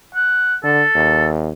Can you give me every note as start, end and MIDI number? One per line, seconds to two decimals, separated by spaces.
0.15 0.55 78
0.64 0.83 50
0.64 1.26 69
0.95 1.52 39